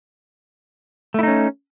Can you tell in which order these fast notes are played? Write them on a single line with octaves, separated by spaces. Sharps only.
A3 E4 D#4 C#4